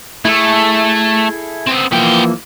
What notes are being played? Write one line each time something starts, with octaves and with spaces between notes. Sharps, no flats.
A3 E4 G#4 A4
B3 C4
E3 F3 A#3 B3 G5